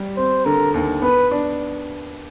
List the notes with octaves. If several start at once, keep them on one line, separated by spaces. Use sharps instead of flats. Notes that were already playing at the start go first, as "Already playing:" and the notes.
Already playing: G3
C4 C5
D3 A#4
D#2
B3 B4
D4